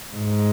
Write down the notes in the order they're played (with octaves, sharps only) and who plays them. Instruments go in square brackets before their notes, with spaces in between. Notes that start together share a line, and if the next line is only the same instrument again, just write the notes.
[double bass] G#2